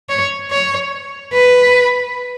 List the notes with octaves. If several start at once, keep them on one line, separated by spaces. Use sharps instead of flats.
C#5
C#5
B4